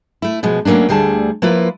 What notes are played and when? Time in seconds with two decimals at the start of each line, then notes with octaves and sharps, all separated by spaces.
0.22 A3 E4
0.43 B2 F3 G#3
0.65 F#3 A3 A#3 C#4 D4
0.89 D2 D3 G3 A3 G#4 A5
1.42 F3 A#3 E4 F4 B4